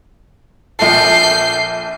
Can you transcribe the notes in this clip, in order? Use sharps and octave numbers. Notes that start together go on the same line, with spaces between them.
A#1 A4 G6 C7